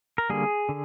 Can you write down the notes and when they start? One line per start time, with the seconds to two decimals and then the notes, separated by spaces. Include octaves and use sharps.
0.18 A#4
0.30 D3 G3 A#3 G#4
0.69 D3